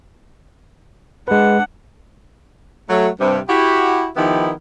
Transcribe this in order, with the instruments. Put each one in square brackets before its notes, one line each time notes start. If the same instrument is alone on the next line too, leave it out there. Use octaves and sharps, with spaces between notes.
[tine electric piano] G#3 B4 [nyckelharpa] D4 F#5
[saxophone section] F#3 A3
G2 C3
E4 F#4 G4
D#3 F3 B3 D#4 E4 G4